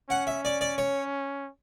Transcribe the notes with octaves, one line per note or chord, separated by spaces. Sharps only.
C#4 F#5
E5
D5
D5
C#5